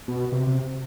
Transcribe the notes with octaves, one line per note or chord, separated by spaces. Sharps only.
B2
C3
C3